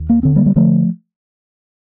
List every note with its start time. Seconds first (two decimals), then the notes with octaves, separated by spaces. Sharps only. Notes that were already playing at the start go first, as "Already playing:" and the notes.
Already playing: D#2
0.09 A#3
0.23 D3 C4
0.36 G3 A#3
0.46 G3
0.56 D3 F3 A3